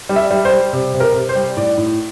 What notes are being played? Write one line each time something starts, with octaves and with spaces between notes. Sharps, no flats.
G3
E5
G3
C5
G3
C3
C3
A#4
C3
C5
G3
A2 D5
A2